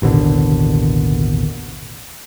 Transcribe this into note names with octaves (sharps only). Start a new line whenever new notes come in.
A1 D#2 B2 D3